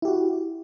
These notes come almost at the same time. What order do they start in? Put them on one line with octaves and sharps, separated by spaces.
E4 G4 F#4